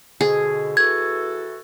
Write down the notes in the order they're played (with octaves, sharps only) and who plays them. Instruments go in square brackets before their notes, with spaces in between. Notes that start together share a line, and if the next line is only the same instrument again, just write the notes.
[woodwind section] G#2 B2 D3 [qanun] G#4
[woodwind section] E3 F#4 A4 [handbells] G#6